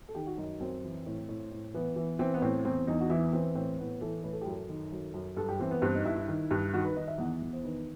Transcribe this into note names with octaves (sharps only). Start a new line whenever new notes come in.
A4
D#3 G4
F#4
F#2 D#4
F#2 C4
E3
A2
A2
A2
E3 B3
E3
E3 C4
B3
A2 C4
E2 C4
E2 D#4
F#4
E3 E4
E3 C4
A2 C4
A2 B3
E3 A4
A2 B4
A4
G4
F#2 A4
D#3
F#2
F#2
G2 A4
G4
E3 C4
B3
G2 C4
D#4
G2 E4
E4
D#3
G2
D#3 F#4
B4
D#3 D#5
E5
E2 F#5
E2
C5
D#3 B4